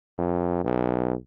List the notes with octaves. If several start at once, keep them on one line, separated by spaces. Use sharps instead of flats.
F2
B1